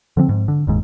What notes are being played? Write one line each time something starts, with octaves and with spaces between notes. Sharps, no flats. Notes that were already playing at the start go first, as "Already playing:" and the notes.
D3 F3 A#3 C4
G#2
D3
F1 D#2 G#2